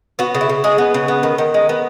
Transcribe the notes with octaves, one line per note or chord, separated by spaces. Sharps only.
B3 F#4
C#3
E4
C#3
G#3 G#4
B3
C#3
B3
D#3
D#3
G#3
B3